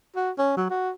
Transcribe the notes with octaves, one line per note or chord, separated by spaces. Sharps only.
F#4
C#4
F#3
F#4